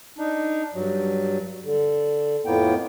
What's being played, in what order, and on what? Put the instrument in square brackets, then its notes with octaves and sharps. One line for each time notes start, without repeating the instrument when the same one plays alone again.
[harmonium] D4 D#4
G2 F#3
D3
F2 A2 A#3 B3 G5